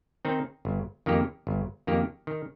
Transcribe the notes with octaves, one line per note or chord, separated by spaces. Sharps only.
D#3 C4 D#4
G1
F2 D#3 A#3 G4
G1
F2 D#3 A#3 G4
D#3